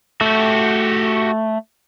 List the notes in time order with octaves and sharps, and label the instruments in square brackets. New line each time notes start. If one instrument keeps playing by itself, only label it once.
[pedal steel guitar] A3 [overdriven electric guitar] F#4 G4